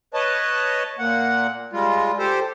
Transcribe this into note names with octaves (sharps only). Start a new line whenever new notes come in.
B4 C#5 D#5 A5
A#2 A#3 F#5
G3 G#3 F4
G4 A4 C5